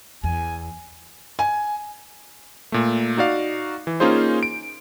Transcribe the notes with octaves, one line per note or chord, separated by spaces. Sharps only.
E2 G#5
G#5
A#2 A3
D#4 F#4 D5 F5
E3
A#3 C#4 D#4 F4 G#4 C5
D7